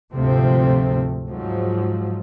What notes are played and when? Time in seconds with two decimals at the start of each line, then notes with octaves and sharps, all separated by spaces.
0.12 D2 G#2 C3 F3 A3 C4
1.28 G#2 F3 F#3